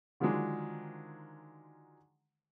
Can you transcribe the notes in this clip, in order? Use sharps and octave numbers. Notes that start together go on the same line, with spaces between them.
D3 D#3 F3 F#3 G#3 D4